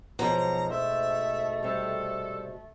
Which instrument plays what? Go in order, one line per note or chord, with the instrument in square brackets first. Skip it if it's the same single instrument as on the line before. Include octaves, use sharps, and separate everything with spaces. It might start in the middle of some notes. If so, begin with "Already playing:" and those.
[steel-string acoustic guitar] G#2 B2 [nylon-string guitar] F3 F#3 C4 [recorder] A#5
[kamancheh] A3 [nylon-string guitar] C5 [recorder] E5
[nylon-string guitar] C3 G3 [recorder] A4